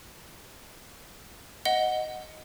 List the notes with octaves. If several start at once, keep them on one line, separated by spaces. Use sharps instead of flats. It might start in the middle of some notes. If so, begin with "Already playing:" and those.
D#5 F#5 G7